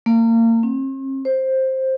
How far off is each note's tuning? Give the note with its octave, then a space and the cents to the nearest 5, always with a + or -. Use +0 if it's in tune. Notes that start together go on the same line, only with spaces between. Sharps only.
A#3 -30
C4 +45
C5 +10